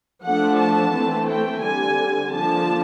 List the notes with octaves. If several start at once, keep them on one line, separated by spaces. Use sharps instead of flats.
F3 A3 D4 F#5
A5
E3 A3 C4
G5
D3 G3 C4 G#5
D3 F3 A#3 D4 A5